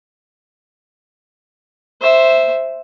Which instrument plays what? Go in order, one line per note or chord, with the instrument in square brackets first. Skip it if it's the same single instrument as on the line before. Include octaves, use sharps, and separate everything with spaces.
[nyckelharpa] C5 E5